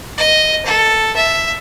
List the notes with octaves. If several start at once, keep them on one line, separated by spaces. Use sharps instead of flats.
D#5
A4
E5